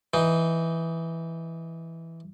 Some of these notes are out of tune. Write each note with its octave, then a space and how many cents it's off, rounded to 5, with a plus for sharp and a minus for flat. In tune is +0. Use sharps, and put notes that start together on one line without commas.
E3 +0 D#4 +5